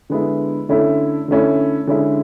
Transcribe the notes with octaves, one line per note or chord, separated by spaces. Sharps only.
D3 G#3 B3 E4
D3 A3 C#4 E4
D3 A3 C#4 E4
D3 G#3 C#4 E4